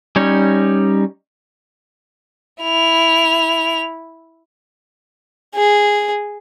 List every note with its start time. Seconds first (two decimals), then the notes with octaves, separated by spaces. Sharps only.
0.16 G3 C#4 D#4 C#5
2.62 E4 F7
5.55 G#4